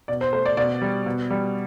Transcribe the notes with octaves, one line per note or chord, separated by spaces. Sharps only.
B2 D5
C5
A3 C5
D5
B2 D5
G3
B2
G3